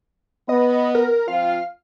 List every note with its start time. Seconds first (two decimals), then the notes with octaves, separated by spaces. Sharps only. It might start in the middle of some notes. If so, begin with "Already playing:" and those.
0.49 B3 D#5
0.95 A#4
1.28 F3 C4 F4 F5